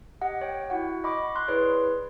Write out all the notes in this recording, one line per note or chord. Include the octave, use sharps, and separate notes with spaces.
G4 D#5 F#5
C#5 G5
E4 F#4 F#5
D#5 B5 C#6 D6
C6 F#6
E4 G#4 B4 C#5 D5